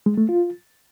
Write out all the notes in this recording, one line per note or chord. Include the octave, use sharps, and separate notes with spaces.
G#3
A3
F4